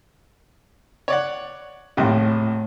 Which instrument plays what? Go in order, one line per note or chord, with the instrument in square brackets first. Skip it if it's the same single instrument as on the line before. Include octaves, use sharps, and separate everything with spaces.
[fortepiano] C#5 D5 F#5
[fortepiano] A#1 D#2 C3 [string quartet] A2